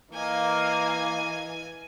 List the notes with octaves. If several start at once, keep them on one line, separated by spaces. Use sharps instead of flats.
E3 A#3 D#5 F5 G#5